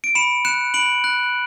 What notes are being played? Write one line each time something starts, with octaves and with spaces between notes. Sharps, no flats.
D7
B5 C#7 E7
F#6 C#7 E7
B5 D7 F#7
F#6